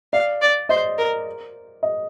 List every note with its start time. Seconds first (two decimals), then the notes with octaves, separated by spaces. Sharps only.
0.13 D5 F5
0.42 D5
0.69 C5 D#5
0.98 A#4
1.83 D#5